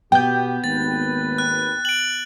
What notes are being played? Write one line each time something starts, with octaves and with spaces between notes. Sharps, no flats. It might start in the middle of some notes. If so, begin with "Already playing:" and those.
B2 B3 G4 G5 G6
G#1 D#2 B4 A6
F#6
D7 F#7